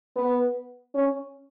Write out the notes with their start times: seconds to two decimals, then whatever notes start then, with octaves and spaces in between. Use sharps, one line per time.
0.16 B3
0.94 C#4